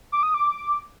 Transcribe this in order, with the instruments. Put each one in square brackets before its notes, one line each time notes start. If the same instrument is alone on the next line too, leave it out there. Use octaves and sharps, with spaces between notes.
[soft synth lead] D6
D#6
D6